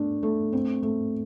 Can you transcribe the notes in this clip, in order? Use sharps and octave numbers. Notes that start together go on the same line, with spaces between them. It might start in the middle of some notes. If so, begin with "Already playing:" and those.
Already playing: A3 D4
A3
C4
A3